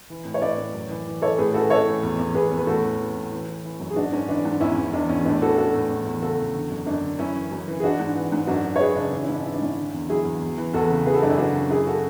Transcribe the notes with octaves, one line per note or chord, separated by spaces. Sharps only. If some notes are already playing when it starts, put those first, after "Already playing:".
E3
A2
C#5
A2 B4 D5
A2
F#2
E3
E3
E3 A4 C#5
A2 G#4 B4
E3 F#4 A4
E3 A4 C#5
A2
E2
E2
E2 G#4 B4
E2
B4
A2 F#4 A4
E3
E3
A2
E3
E3
E3
F#2
G#4
G#2 D4 F#4
G#2 C#4
E3 D4
G#2
E2 C#4 E4
E2
E2 D4
E2 C#4
A2 D4
E3 F#4 A4
E3 F#4 A4
A2
E2
E2
C#3 F#4 A4
E2
D3
F#2
F#2 D4
D3
F#2 C#4 E4
E3
F#2
E3
G#4
E3 D4 F#4
G#2
E3
G#2
F#2 D4 F#4
F#2
C#5
F#3 G#4 B4
C#3 D4
E3 D4
C#4 E4
G#2
D4
E3 E4
D4
G#2 C#4 E4
D3
E2
F#3 E4 G#4
E2
E2
E3
E2 F#4 A4
C#3
E3 G#4 B4
F#4 A4
F#2 D4
C#4 E4
C#3 D4 F#4
F#2
F#2 E4 G#4
C#3 F#4 A4